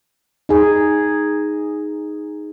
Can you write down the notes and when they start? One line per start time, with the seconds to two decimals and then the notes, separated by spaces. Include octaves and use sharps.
0.49 D#4 G#4